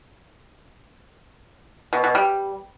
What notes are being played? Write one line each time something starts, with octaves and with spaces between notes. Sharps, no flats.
B2
B2
G3